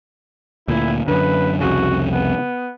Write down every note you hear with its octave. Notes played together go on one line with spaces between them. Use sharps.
D2 A#2 E4
F#2 D3 B4
C2 F2 C#3 F#4
B3